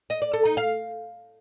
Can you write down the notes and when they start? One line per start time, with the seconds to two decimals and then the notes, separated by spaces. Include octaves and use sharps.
0.10 D#5
0.22 D5
0.34 A4
0.45 D#4
0.57 F5